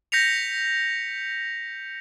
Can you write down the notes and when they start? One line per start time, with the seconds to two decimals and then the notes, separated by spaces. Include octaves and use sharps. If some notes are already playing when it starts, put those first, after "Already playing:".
0.12 G6 A#6 B6 C#7 F7